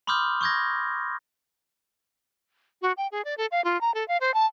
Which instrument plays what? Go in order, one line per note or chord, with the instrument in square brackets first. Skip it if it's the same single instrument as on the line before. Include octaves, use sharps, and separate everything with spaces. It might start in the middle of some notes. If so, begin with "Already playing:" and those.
[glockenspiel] B5 C6 D6 D#6 F6 G6
C#6 D#6 G6 G#6 A#6
[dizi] F#4
G5
G#4
D5
A4
F5
F4
A#5
A4
F5
C5
A5